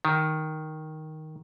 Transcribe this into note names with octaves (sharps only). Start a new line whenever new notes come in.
D#3